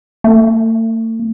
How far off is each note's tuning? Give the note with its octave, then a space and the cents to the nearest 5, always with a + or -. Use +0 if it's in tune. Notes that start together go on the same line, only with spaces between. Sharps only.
A3 +40